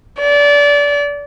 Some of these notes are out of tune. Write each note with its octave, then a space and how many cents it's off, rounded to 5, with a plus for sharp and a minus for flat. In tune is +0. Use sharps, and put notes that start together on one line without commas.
D5 -25